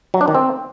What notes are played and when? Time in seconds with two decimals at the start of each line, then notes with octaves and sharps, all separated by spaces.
0.14 F#3
0.21 D4
0.28 D#3
0.35 C4